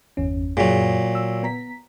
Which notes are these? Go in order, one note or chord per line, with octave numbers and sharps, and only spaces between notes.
G1 E2 C#4
F#2 A#2 F#3 G#4
E6
B3 A#5 B6